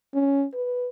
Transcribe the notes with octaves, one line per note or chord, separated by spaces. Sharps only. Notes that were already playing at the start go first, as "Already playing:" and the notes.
C#4
B4